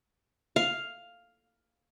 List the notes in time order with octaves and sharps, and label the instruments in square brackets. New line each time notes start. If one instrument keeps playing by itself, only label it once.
[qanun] F5